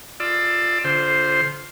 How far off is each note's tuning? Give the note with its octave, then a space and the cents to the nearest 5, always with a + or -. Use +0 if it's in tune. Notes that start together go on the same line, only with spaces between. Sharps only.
F4 +0 D5 +20 E6 +0
D3 -40 F4 +0 C5 +0